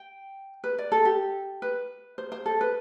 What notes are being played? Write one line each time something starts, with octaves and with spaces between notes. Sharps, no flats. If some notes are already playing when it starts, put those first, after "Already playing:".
Already playing: G5
B4
D5
A4
G4
B4
C5
C5
A4
B4